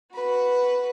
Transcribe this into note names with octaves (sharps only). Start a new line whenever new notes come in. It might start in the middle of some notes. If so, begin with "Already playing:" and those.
F#4 B4